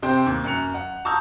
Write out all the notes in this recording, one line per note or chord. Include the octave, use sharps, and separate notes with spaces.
C3 C4 G4 C5 G5 G6
D#2
F#2 F#6 C#7 F7
F#5
A5 A#5 C#6 D#6 E6 G6